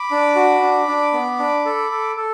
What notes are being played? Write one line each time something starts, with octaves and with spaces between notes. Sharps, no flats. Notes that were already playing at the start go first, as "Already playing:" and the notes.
Already playing: B5 D6
D4
F#4
D4
D4
B3
D4
A4
A4
A4